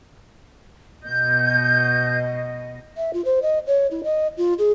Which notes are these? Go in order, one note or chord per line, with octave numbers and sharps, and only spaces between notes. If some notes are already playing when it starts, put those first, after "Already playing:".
B2 D#5 G6
E5
F4
C5
D#5
C#5
E4
D#5
F4
G#4